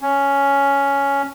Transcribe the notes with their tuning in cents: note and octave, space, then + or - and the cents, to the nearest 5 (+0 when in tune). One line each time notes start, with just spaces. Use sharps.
C#4 +5